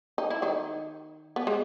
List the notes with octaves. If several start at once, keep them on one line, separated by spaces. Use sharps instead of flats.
D#4
E4
D#3 D#4
B3
G#3